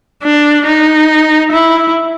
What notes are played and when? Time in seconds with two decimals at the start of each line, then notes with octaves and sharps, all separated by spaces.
0.23 D4
0.66 D#4
1.52 E4